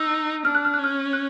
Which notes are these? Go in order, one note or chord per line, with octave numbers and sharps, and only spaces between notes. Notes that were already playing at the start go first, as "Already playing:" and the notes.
Already playing: D#4 E6
D4 F6
F#6
F6
F#6
C#4 F6
F#6